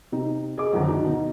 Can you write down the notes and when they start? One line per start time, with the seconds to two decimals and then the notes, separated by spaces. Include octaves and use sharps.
0.12 C3 D#4
0.58 G#4 D#5 D6
0.72 F#2 D3 D#3 F3 F#3
0.88 D2 D4 D#4
1.06 B2 D#4